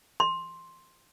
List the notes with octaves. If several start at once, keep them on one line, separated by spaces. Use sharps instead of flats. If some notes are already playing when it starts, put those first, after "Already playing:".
C6